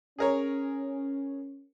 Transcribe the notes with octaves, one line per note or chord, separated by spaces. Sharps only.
C#4 G#4 A#4 C#5